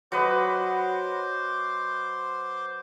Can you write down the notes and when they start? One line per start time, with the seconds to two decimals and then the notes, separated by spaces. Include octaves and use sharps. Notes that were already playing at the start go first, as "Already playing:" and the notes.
0.12 F#3 B4 C5 D#5 C6 D6